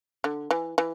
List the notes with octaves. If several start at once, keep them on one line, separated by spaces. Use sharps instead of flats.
D3
E3
E3